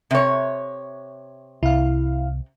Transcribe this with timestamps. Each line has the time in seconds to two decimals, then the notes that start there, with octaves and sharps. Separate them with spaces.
0.11 C3 C#5
1.63 C2 E4 F5